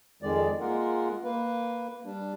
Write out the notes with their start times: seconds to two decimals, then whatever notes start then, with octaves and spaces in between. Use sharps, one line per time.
0.23 F2 D#3 G#3 D5
0.60 G#3 A#3 F4 A#4 F#5
1.24 A#3 B4
2.05 G3 D4